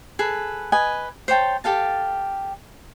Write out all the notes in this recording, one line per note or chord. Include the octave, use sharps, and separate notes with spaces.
G#4 A4 B4
B4 D#5 G#5
C5 C#5 G5 A5
G4 A4 F5 A5